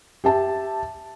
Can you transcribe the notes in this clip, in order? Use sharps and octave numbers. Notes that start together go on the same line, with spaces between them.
G4 E5 A5